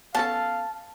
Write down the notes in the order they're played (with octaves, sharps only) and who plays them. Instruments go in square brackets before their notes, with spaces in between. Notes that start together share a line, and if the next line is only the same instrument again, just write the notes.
[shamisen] B3 C#4 A4 [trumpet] F5 [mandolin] A5